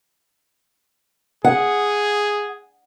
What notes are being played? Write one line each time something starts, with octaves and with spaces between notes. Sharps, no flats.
G#4 F#5